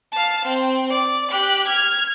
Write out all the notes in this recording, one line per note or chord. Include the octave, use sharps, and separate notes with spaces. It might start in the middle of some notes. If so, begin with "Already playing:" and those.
F5 A5
C4
D5
G4 F#6
F6 G#6